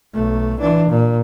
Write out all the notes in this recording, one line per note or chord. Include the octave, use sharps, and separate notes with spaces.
B1 A3
E3 D4
A#2